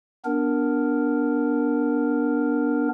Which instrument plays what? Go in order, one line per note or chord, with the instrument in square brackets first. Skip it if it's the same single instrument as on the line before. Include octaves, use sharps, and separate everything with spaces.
[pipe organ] B3 D4 A#4